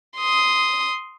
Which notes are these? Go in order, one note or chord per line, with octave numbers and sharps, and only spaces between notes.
C6 D#6